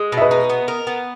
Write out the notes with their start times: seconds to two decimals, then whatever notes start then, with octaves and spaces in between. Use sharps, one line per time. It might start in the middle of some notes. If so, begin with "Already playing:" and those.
Already playing: G#3
0.12 B2
0.17 E5
0.22 B4 D#5
0.31 D#4
0.50 B3
0.68 A#4
0.87 B3